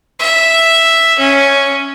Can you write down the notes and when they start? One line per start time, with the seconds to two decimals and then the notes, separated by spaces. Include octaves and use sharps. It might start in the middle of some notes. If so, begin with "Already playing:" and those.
0.20 E5
1.19 C#4